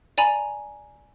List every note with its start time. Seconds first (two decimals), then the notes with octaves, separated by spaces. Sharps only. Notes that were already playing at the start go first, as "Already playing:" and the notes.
0.18 D5 G#5 A#5 B5